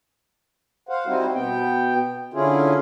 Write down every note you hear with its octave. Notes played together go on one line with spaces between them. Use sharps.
C5 F5 F#5
G3 C4 D#4 E4 F#4 C5
B2 B3 G5
D3 C#4 E4 F4 G#4